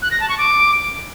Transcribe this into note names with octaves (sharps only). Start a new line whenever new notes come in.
F#6
A#6
A5
C#6
D6